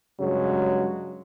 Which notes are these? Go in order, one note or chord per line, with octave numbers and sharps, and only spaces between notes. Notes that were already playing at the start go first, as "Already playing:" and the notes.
G2 C#3 F#3 G#3